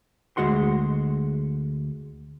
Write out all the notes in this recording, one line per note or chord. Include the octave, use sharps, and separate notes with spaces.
D2 G#2 G#3 F#4 F#5 C6